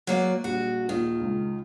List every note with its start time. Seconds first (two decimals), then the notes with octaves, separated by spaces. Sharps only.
0.07 F#3 A#3 D5
0.44 A#1 G3 F#4
0.89 A#1 D#2 D#3 F4
1.21 C#2